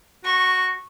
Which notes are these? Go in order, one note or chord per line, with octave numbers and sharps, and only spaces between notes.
F#4 C#6